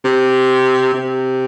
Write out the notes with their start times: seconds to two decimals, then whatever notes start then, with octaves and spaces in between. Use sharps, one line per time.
0.05 C3
0.94 C3